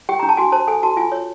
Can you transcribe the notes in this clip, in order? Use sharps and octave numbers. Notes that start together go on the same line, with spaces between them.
G4 G5
D4 A#5
A5
F#4 G#5
C5 A5
A4 G#5
F#4 A5
F4 G#5
C#5